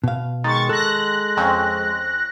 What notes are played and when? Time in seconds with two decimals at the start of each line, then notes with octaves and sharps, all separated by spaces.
0.04 B2 F5
0.44 D#3 G#3 C#6 A6
0.69 A4 F#6 A#6
1.37 F2 C4 C#4